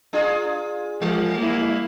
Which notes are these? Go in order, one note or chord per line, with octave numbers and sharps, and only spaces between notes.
D4 F4 G#4
F3 G3
A#3 E4